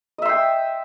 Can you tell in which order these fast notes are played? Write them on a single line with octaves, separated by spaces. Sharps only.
D#5 E5 C6 G5